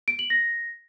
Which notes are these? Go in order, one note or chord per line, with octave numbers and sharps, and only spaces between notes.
D7
F#7
A#6